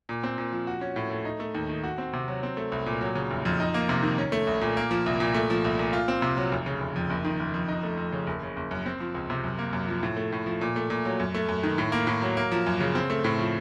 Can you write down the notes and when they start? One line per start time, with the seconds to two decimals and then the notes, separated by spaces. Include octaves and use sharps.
0.09 A#2
0.23 C4
0.38 A#2
0.52 F3
0.67 F#4
0.81 C#4
0.96 A2
1.10 A3
1.25 D#4
1.40 A3
1.55 D#2
1.69 D#3
1.84 F#4
1.98 C4
2.13 C3
2.28 F#3
2.43 C4
2.57 A3
2.72 C2
2.86 A#2
3.01 F#3
3.16 C#3
3.31 F1
3.45 F2
3.60 D#4
3.74 A#3
3.89 C3
4.03 D#3
4.18 C#4
4.32 A3
4.47 C2
4.61 A#2
4.77 A#3
4.91 F3
5.06 C2
5.20 A#2
5.34 A3
5.50 F3
5.64 C2
5.79 A#2
5.93 F4
6.08 C4
6.22 C3
6.37 F#3
6.52 F1
6.66 C#3
6.80 F1
6.96 F2
7.10 F#1
7.25 D#3
7.40 F#1
7.54 F2
7.68 D#4
7.83 A3
7.97 F2
8.12 C#3
8.27 F#1
8.42 C#3
8.57 F#1
8.71 F#2
8.86 C4
9.00 F3
9.15 C#2
9.30 C3
9.44 F#2
9.59 A#3
9.73 F#2
9.88 F3
10.03 A2
10.17 A3
10.32 A2
10.46 F3
10.61 A#2
10.76 A3
10.90 A#2
11.05 F#3
11.20 F#2
11.34 A3
11.49 F#2
11.63 D#3
11.78 A2
11.92 A#3
12.07 A2
12.22 F#3
12.37 A#3
12.52 F3
12.66 F#2
12.81 C#3
12.95 C4
13.10 A3
13.24 A2
13.39 F3